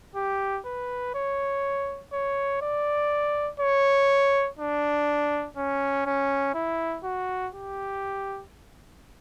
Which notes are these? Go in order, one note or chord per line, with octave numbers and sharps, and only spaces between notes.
G4
B4
C#5
C#5
D5
C#5
D4
C#4
C#4
E4
F#4
G4